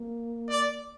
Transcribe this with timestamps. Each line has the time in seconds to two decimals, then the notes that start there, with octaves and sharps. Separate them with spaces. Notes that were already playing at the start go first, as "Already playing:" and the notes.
Already playing: A#3
0.50 D5